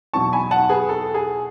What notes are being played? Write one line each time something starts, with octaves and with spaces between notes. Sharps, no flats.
E2 B2 F#3 A5 C#6
G#5 B5
F#5 A5
G#4 B4
A4
G#4